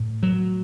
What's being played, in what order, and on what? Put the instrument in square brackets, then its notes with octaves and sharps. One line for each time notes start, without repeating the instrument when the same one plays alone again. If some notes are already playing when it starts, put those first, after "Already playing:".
Already playing: [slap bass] A2
F#3